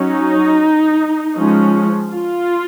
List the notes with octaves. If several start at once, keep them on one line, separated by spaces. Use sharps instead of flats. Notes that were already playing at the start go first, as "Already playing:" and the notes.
Already playing: F#3 C#4 D#4
F3 G#3 C#4
F4